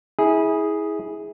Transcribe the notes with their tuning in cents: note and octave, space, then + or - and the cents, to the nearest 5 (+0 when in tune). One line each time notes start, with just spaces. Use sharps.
E4 -30 G#4 +0